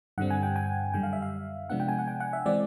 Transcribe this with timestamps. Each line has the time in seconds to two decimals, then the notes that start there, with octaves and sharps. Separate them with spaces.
0.18 G2 D3 G3 C4 F#5
0.30 G#5
0.43 G5
0.56 G#5
0.94 F#2 D3 G3 G5
1.03 F5
1.13 E5
1.22 F5
1.70 C3 F3 G#3 B3 D4 F#5
1.80 G5
1.89 G#5
1.99 F#5
2.08 G5
2.20 F#5
2.33 E5
2.46 E3 G#3 C4 D5